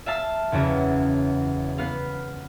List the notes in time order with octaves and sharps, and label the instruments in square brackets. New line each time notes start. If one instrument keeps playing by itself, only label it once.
[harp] E5 F5 A5 E6
F#1 E2 C#3 F#4
B3 B4 F5